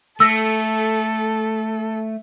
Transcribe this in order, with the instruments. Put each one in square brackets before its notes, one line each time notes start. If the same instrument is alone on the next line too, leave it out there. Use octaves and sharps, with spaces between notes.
[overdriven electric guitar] A3 [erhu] A4 [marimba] E6 A#6